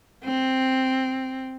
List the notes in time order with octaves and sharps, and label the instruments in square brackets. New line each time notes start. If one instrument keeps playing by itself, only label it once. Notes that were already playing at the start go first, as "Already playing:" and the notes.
[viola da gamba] C4